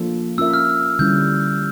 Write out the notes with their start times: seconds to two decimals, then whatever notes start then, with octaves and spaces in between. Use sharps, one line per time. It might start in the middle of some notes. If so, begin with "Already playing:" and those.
Already playing: F3 A#3 D4 F4 A4
0.38 C#4 F4 A#4 E5 E6
0.54 F6
0.99 D3 G3 C#4 E4 G6